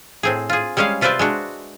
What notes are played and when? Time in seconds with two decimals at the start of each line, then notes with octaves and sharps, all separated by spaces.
0.23 A2 C4 G#4
0.50 F4 G#4
0.77 G3 G#3 C#4 G#4 F5
1.01 C3 F4 B4 C5 D5 E5
1.19 G#3 D4 F#4